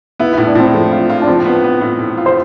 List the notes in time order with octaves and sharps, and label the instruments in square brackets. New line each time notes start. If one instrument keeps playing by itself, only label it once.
[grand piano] B3 [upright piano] E4
[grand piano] A2 [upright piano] E4
[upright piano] D4
[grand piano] A2 [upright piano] C4
[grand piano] F3 [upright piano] A3
[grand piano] F4
F4
[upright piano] D4
[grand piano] F3 [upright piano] C4
[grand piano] B3
B3
A2
A2
F4
[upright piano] C5